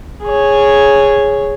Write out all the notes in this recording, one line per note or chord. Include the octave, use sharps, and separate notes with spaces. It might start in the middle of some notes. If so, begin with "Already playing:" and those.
G#4 C#5